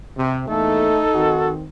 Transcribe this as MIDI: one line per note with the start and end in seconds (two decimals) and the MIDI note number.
0.17 0.45 48
0.48 0.90 40
0.48 1.02 57
0.48 0.90 58
0.48 1.58 63
0.48 1.53 69
1.15 1.65 51
1.15 1.65 60
1.15 1.51 66